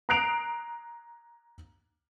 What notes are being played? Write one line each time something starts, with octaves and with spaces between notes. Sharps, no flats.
A#5 D#6 F#6 C7 D7 F7